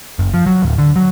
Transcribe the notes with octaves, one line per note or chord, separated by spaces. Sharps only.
F#1
F3
F#3
D1
D3
F#3